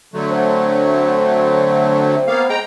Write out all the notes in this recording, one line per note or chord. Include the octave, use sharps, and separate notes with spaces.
D3 F#3 A3
C4
A#3 B3 F5
G#3 G5 A#5